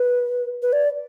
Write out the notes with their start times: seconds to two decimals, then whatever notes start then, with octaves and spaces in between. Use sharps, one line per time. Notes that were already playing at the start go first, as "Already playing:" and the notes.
Already playing: B4
0.62 B4
0.73 D5